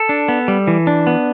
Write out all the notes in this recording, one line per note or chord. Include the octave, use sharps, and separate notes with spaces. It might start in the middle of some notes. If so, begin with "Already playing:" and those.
Already playing: A4
D4
B3
G3
E3
D4
B3